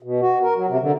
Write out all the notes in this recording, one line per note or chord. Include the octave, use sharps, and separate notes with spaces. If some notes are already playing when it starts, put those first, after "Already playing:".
B2
F#4
A#4
F#3
C3
D3